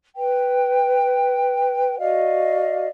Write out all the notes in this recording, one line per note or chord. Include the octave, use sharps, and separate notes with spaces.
B4 G5
F#4 D5 D#5 F5